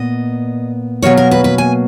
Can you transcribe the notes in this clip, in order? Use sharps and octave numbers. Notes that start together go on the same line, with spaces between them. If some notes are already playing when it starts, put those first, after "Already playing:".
Already playing: A#2 B3 D#5
B2 F#3 A#3 C#5
A#4
B4
B4
G#5